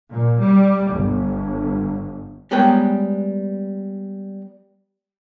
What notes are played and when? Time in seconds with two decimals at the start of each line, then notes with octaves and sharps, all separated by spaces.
0.10 A#2
0.40 G3
0.92 G1
2.51 G3 G#3 B3 A#4 C#5 G5